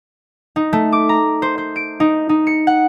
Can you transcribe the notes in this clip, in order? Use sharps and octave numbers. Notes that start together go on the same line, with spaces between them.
D#4
A3
D6
A#5
C5
C5
D7
D#4
D#4
C#7
F#5